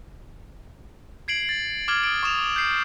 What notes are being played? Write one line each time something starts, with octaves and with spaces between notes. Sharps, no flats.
G#6 C7 D7 F#7
A6
D6 F6 G#6 F#7
D#6 D7
C#6 D#6 E7 F7
G6 C7